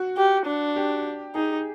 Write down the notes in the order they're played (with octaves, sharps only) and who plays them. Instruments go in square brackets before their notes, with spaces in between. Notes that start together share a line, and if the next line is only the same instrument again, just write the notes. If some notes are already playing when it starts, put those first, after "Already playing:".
Already playing: [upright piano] F#4
[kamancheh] G4
D4
[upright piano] G4
[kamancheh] D#4 [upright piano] G#4